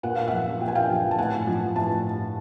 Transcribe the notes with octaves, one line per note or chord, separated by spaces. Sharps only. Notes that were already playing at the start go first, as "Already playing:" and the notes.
A#2 F#5
F5
F3 E5 F#5
A#2 G5
G#5
F5 G5
F3
A5
A2 F#5 G#5
F3
A2 A5